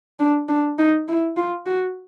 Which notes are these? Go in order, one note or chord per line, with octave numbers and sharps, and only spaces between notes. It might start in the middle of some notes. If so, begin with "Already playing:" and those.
D4
D4
D#4
E4
F4
F#4